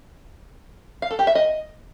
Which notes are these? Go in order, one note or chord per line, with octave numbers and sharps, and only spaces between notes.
F5
A4
G4
E5
D#5